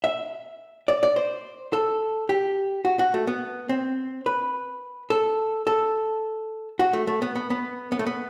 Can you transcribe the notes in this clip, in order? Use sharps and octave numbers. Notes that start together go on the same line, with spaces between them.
E5
D5
D5
C5
A4
G4
F#4
F#4
A3
B3
C4
B4
A4
A4
F#4
A3
A3
B3
B3
B3
B3
A3
B3